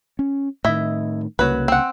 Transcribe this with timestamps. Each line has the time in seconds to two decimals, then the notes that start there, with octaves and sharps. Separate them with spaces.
0.19 C#4
0.65 A2 D#3 E4 D#5 E5
1.39 C2 C#3 F#3 A#3 B4
1.68 C4 F#5